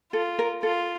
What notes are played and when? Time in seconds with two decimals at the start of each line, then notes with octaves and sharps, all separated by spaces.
0.13 F4 A4
0.39 A#4
0.63 F4 A4